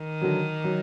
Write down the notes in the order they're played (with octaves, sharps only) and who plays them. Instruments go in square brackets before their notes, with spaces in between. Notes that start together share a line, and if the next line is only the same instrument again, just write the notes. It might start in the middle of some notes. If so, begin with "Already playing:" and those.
Already playing: [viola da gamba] D#3
[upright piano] D3 F#3
F#3